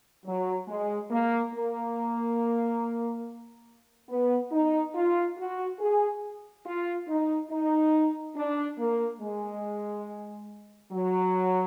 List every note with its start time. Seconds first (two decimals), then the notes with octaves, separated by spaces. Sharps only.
0.25 F#3
0.68 G#3
1.10 A#3
1.53 A#3
4.09 B3
4.52 D#4
4.95 F4
5.38 F#4
5.80 G#4
6.65 F4
7.08 D#4
7.50 D#4
8.36 D4
8.78 A#3
9.21 G#3
10.92 F#3